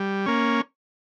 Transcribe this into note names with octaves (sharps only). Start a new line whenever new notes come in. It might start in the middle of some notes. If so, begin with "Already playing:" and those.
Already playing: G3
A#3 C#4